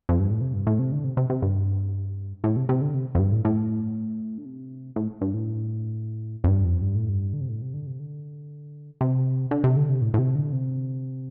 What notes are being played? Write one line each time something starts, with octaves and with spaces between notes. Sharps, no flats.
F2
G2
A2
C3
G2
A2
C3
D3
C3
C3
C3
G2
A2
C3
C3
D3
C3
F2
G2
A2
A2
D3
C3
A2
G2
A2
F2
G2
F2
G2
A2
G2
D3
C3
A2
C3
D3
C3
D3
C3
D3
C3
D3
C3
A2
A2
C3
D3
C3